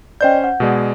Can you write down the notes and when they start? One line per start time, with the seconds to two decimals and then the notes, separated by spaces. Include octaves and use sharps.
0.21 C#4 C5 D5 D#5 G5 G6
0.44 F#5
0.60 B2 G#3 D5